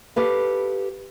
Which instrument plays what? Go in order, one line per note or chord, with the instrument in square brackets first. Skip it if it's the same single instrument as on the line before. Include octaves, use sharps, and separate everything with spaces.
[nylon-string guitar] G4 A4 B4 F5